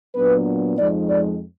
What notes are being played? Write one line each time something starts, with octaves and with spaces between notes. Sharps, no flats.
A#2 F#3 B3 D4 B4
F2 F3 G#3 D#4 D5
D5